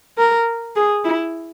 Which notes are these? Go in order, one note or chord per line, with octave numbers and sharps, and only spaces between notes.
A#4
G#4
E4